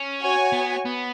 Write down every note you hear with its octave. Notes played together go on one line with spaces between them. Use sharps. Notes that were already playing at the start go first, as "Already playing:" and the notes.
Already playing: C#4
F#4 C#5 G#5
B3
B3